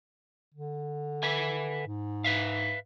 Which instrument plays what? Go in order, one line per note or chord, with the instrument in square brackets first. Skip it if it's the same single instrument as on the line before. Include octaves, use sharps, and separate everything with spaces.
[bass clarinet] D3
[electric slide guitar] B4 E5 G#5
[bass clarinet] G#2
[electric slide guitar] B4 E5 F5